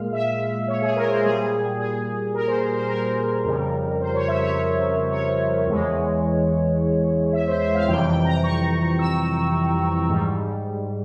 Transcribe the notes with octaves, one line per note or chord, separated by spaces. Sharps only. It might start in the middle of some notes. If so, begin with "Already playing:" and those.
Already playing: A#2 G#3 F5
E5
C#5
G#4
A#4
C5
A#2 G3 G#4
G#4
A#4
C5
A#4
C5
A#4
F2 C#3 G3
C5
C#5
E5
C#5
C#5
E2 E3 G#3
E5
C5
E5
F5
F2 C3 E3 G3 G5
G5
A#5
C#6
E6
G#2 G3